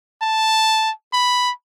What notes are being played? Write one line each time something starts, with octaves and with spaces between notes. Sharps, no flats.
A5
B5